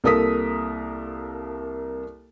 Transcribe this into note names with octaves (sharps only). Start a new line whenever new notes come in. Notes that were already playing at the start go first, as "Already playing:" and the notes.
C2 A#3 A4 A#4 D#6 B6